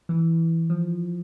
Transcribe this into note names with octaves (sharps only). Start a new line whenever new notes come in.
E3
F3